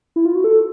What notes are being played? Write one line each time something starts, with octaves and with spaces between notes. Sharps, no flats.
E4
F4
F#4
A4